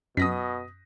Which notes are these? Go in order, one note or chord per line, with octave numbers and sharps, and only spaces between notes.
F#2 B2 D#6 A#6 B6